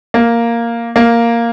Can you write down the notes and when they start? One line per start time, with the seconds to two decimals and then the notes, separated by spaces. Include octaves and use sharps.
0.14 A#3
0.96 A#3